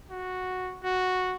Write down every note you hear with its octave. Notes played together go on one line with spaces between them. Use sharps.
F#4
F#4